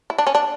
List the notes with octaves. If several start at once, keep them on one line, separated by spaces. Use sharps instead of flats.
E4
D4
C#4
D4